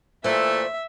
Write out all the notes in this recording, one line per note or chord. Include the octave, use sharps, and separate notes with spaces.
A#2 E3 A3 C5 D5 E5